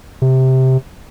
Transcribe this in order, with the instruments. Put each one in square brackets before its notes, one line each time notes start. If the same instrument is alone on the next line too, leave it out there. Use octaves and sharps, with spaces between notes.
[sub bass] C3